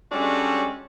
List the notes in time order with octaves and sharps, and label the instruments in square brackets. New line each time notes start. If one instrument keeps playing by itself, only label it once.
[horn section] G3 G#3 C#4 D4 F#4 A4